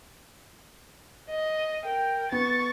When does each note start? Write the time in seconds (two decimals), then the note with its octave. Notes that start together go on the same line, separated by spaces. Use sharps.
1.30 D#5
1.84 A#4 G5
2.32 B3 C#6 A6